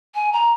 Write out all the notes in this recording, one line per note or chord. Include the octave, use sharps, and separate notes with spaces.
G#5
A#5